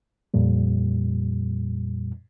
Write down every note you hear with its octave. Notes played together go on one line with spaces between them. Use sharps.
F2 A#2 G3